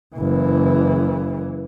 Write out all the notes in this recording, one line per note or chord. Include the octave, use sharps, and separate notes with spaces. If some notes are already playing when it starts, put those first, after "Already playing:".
F#1 E3